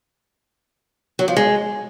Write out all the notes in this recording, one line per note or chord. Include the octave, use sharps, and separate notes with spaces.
F#3
F3
G#3